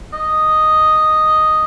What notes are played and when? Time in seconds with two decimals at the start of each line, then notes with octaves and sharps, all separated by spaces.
0.13 D#5